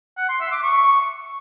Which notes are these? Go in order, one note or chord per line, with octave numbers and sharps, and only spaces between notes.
F#5
C6
E5
D6
C#6